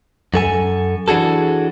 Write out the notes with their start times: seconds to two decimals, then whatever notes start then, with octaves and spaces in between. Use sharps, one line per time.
0.34 F#2 A4 G#5
1.08 E3 D4 F#4 G#4 A4